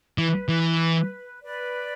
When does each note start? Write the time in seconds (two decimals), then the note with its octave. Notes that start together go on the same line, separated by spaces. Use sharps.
0.17 E3 B4
0.48 E3
1.43 B4 D5